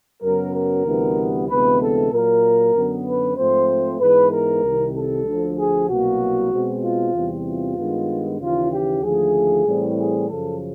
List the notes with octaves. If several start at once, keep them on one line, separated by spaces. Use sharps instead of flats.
F#2 C#3 F#3 B3 A#4
A#4
D2 C3 E3 G3 B3
D2 C3 E3 G#3 B3 B4
A4
A#2 F#3 A#3 A#4
F#2 D3 F#3 B3
B4
G#2 F3 A3 C4 C5
G#2 E3 G#3 B3 B4
A#4
C2 C3 D#3 G3
A4
D2 D3 F3
G#4
C2 B2 F#3 A#3 F#4
B2 G#3 C4
F4
E2 C3 E3 G3 C4
F4
G2 D#3 G#3 B3
D#2 C#3 E3 F4
G4
D#2 D3 F3 A3 G#4
A2 E3 G3 C4
G#4
F#2 C#3 F3 A4